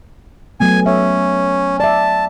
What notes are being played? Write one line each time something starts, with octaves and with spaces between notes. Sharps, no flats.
F#3 A3 B3 G#5
C#4 E5
D5 E5 A5